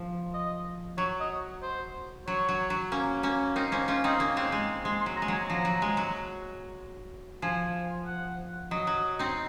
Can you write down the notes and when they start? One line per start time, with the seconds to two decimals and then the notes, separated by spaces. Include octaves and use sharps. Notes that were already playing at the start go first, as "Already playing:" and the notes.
Already playing: F3
0.34 D#5
0.98 F#3 C#5
1.20 D#5
1.63 C5
2.27 F#3 C#5
2.49 F#3
2.70 F#3
2.92 A#3 C#4
3.23 A#3 C#4
3.55 C4 D#4 A#4
3.72 A#3 C#4 C5
3.88 C#4 F4 C5
4.04 C4 D#4 D#5
4.20 A#3 C#4
4.37 G#3 C4
4.52 G#3
4.85 G#3 C6
5.00 C6
5.06 F#3
5.17 A#5
5.22 G#3
5.28 F#3 G#5
5.49 F3 A#5
5.65 F#3
5.82 G#3
5.97 F#3
7.42 F3 G#5
8.06 F#5
8.71 F#3 D#5
8.87 F#3
9.19 C4 D#4